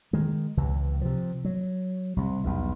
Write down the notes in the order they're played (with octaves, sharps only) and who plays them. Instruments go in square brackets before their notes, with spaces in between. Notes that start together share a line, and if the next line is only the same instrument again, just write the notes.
[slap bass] D#3 G#3
C#2 C3 E3
C3 F3
F#3
C2 C3
B1 E2 G2